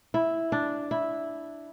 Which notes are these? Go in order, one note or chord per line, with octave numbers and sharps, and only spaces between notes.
E4
D4
E4